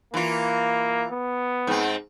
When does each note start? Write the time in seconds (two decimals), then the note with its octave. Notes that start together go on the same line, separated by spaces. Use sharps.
0.14 E3 A#3 F4
1.11 B3
1.67 G#2 C4